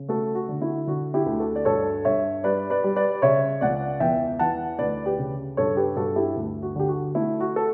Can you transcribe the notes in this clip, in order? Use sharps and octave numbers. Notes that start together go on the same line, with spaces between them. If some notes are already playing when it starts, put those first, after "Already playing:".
Already playing: C#3
A3 F#4 A4
F#4
D3
E4
D3 F#4
E4 G4
D2
F#4 A4
D5
G2 A4 C#5
G2 C#5 E5
G3 B4 D5
B4 D5
G3
B4 D5
C#3 C#5 E5
C#2 D5 F#5
E2 E5 G5
E3 F#5 A5
D2 B4 D5
G4 B4
C#3
G2 A4 C#5
G4 B4
G2 F#4 A4
E4 G4
D2
F#4
D3 G4
F#4
A3 E4
F#4
A4